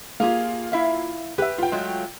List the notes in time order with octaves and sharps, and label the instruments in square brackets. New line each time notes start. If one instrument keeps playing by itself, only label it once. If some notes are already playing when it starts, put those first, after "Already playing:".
[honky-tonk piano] A#3 F4 [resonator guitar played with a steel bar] G4 G#4 F5
[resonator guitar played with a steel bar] E4 E5 F5
[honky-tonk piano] G4 E5 [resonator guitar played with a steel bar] B4
[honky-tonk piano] F4 G5
[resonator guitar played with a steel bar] F#3 G#3 A3